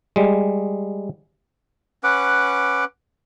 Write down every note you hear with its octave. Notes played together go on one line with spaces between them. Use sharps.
G3 G#3
C#4 B4 F#5 D6